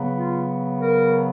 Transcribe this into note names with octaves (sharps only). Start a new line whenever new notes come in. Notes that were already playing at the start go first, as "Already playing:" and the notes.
Already playing: C#3 F#3 B3
F4
A#4